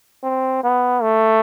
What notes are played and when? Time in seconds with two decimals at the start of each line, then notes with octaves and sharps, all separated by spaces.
0.23 C4
0.63 B3
1.02 A3